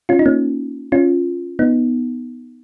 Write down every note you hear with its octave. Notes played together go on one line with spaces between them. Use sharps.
C#4 F4
D#4
A#3 C#4
C#4 F4
B3 D#4